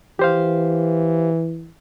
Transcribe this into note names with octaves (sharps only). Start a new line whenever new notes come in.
E3 G4 C5 F5